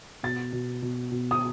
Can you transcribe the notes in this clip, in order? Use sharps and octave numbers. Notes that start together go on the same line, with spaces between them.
B2 A6
B2
B2
B2
D#6